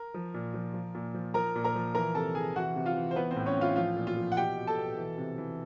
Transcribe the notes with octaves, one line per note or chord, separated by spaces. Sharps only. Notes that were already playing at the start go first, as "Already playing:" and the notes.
Already playing: A#4
F3
A#2
F3
F3
A#2
F3
F3 A#4 A#5
A#2
A#4 A#5
F3
E3 A#4 A#5
C3 A4 A5
E3 G#4 G#5
E3 F#4 F#5
C3
F4 F5
E3
C5
E3 B3 B4
C4 C5
A2
C#4 C#5
E3
F4 F5
F3 F4 F5
A#2
F4 F5
F3
F#5
B2 G4 G5
B2
A4 A5
B2
E3
C3
E3